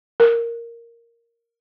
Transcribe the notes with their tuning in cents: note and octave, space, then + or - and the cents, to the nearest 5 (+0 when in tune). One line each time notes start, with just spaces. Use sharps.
A#4 -5